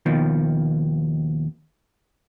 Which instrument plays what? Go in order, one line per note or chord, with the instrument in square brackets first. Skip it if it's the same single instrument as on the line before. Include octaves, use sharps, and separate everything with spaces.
[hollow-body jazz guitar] D#2 B2 D#3 F3